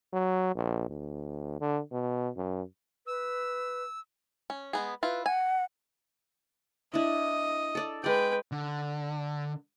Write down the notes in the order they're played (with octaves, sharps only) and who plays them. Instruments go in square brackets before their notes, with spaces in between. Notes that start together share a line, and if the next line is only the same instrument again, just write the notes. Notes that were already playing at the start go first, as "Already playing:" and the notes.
[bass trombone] F#3
A#1
D2
D3
B2
F#2
[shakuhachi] B4 [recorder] E6
[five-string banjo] C#4
G#3 B3 G#4
[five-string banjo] E4 F4 [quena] B4
[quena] F#5 [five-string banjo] G#5
[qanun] D4 E4 [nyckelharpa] D#5
[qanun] A4 D5
[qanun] G#3 D5 [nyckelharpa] B4 G5
[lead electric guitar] D3